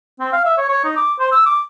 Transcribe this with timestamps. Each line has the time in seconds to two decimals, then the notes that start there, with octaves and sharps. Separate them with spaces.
0.20 C4
0.33 F5
0.45 E5
0.58 C#5
0.69 C#5
0.84 D#4
0.97 D6
1.20 C5
1.32 E6
1.46 D6